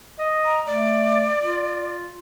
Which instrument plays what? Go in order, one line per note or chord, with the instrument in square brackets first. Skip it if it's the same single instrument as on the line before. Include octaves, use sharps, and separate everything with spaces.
[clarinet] D#5
[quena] A#5
[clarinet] A3 [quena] D5
[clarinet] F4